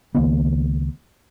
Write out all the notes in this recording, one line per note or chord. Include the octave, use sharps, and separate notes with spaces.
C#2 D#3 A#3 B3